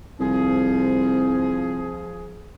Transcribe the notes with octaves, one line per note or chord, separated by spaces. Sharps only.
C2 F3 G#4